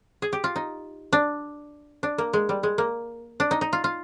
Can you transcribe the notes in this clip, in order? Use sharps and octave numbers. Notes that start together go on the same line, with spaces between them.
G#4
G4
F4
D#4
D4
D4
A#3
G#3
G3
G#3
A#3
D4
D#4
D#4
F4
F4